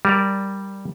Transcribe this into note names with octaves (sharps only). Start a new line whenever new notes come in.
G3 A#4 D5